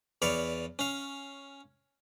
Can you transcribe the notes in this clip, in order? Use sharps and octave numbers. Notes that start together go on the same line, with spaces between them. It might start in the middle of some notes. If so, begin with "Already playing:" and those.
E2 C#5 D5 F5 B5
C#4 F5